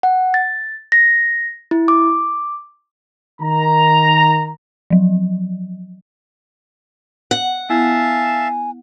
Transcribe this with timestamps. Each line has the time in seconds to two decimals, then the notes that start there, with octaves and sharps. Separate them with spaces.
0.03 F#5
0.34 A6
0.92 A#6
1.71 E4
1.88 D6
3.41 D#3 A#5
4.90 F3 F#3
7.31 F#5
7.69 B3 E4 E5 F5 G#5 A5 G#6